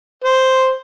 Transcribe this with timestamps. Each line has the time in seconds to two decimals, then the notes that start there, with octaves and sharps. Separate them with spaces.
0.24 C5